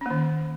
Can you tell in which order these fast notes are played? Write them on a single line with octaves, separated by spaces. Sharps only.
C#4 A#3 D#3